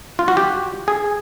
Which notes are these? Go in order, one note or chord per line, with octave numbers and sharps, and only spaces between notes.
F4
F#4
G4
G#4